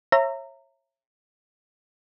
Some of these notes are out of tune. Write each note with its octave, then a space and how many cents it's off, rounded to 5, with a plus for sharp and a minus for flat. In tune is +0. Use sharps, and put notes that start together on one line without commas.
C#5 -30 E5 +20 A#5 -20